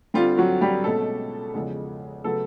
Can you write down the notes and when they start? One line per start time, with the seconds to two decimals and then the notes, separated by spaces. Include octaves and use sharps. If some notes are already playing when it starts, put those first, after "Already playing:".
0.14 D3 G3 C4 F4
0.38 F#3 F#4
0.61 G3 G4
0.84 B2 G#3 A3 C#4 A4
1.54 E2 C#3 F3 G#3
2.24 C#3 F#3 A3 B3 A4